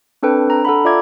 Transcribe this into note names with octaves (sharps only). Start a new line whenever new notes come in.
C4 D4 A4 B4 G5
D4 A#5
A4 F#5 B5
F4 D5 E5 A#5 D6 G#6